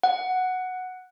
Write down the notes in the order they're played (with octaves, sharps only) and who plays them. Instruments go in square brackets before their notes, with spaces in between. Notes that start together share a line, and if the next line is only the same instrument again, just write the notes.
[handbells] F#5